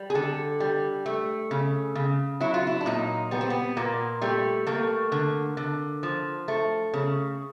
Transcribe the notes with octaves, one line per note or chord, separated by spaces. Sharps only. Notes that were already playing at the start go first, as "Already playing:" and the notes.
Already playing: G3
G#4
D3 A4
G3
A3
C#3
C#3
F#3 E4
F4
E4
D4
A#2 D#4
G3 B3
C4
B3
A#2 A#3
G3 A3
A3 A#3
D3
D3
F3
A3
C#3